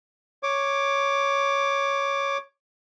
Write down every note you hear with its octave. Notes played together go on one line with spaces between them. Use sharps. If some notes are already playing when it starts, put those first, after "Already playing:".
C#5 D6